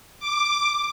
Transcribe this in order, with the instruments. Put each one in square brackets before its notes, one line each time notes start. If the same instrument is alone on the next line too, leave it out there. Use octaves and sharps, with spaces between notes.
[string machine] D6